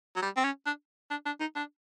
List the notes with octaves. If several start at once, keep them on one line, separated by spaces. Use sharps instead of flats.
F#3
G3
C4
C#4
D4
D4
D4
D#4
D4